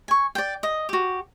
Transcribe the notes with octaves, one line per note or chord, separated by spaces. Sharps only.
G#5 C#6
D5 G5
D#5
F#4 G4